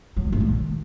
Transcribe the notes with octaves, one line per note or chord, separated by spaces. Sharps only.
F#3
G#3
A2
A#2
D#3